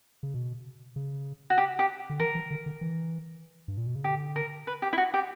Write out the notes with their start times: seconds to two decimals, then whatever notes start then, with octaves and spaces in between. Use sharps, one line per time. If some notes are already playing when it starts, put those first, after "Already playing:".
0.23 C#3
0.34 B2
0.96 C#3
1.50 F#4
1.58 G4
1.79 G4
2.10 D3
2.20 E3 A#4
2.35 E3
2.51 D3
2.66 D3
2.81 E3
3.68 G2
3.77 A#2
3.86 B2
3.95 C#3
4.04 D3 G4
4.36 A#4
4.67 B4
4.82 G4
4.93 E4
4.98 F#4
5.14 G4